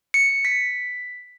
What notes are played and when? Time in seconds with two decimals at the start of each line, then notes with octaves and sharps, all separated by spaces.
0.14 C#7
0.45 B6